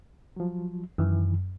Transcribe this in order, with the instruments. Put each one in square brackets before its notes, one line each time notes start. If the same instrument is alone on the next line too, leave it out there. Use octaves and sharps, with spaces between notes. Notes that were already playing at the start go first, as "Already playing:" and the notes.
[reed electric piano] F3 F#3
[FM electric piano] F#2 [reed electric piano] D#3 E3